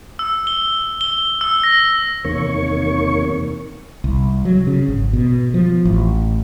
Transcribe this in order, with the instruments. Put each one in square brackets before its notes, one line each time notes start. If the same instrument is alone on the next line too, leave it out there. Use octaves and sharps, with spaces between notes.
[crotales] E6
G7
G7
E6
A#6
[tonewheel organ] E2 C3 D#3 A#3 C#5 C#6
[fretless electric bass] C2
F#3
C#3
G#1
B2
F3
A1